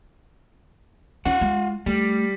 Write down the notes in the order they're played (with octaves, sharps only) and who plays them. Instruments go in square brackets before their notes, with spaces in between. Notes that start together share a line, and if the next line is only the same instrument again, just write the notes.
[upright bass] C#4 [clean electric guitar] F4 F#5
[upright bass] G#3
[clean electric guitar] G3 [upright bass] A3